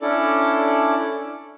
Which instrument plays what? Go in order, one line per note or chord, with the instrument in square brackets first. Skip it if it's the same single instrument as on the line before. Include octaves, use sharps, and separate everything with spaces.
[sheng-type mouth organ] C#4 D4 E4 A4 D5